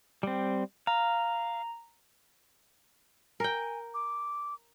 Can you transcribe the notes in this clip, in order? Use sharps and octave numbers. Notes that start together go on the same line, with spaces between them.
G3 C4
F5 A#5
A#4 G5 G#5
D6